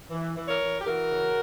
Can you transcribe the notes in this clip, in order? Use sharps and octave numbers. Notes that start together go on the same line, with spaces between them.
E3
E3
A#4 C#5
E3
G4
E3 F#4 A#4
C#3